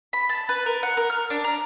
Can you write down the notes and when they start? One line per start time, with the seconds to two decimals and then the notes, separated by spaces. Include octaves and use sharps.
0.13 B5
0.29 A5
0.49 B4
0.66 A#4
0.83 F#5
0.97 A#4
1.10 F6
1.30 D4
1.44 A#5